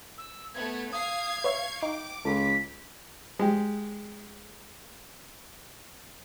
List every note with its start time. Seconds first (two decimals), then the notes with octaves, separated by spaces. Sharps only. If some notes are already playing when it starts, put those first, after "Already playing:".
0.18 E6
0.54 A3 B3 G#6
0.92 F5 D#6 G#6 C7
1.44 B4 C#5 E5 C#6
1.83 D#4 G5 D6
2.25 C#2 A4 B6
3.39 G#3 G4